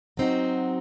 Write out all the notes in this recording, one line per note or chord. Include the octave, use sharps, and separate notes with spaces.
F#3 C4 D#4 F#4